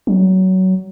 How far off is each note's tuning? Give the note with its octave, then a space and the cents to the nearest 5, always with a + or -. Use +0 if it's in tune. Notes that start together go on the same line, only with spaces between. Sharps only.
F#3 +20